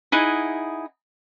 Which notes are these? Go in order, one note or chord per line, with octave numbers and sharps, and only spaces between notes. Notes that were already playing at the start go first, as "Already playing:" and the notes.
D#4 E4 G#4 F#5